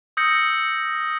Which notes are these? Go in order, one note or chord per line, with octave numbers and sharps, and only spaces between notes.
D#6 E6 G6 A#6 C#7